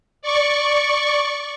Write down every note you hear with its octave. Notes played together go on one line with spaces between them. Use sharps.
D5 C#6